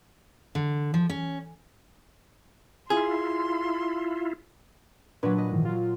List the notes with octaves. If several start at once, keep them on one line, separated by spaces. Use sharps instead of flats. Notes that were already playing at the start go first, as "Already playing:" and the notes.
D3
F3
C#4
E4 F4 G#4 C6
A#2 F#3 D4 B4
D#5
G#2 D#3 E3
F#3 F4